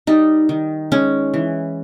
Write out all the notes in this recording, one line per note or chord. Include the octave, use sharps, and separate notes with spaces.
G3 D#4
D#3
G#3 C#4
E3